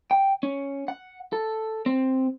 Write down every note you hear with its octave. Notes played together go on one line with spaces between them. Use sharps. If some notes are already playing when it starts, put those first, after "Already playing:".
G5
C#4
F#5
A4
C4